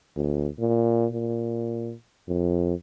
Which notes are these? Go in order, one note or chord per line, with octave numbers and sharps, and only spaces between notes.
D2
A#2
A#2
F2